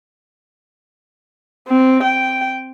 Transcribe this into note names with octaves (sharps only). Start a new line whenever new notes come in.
C4
G5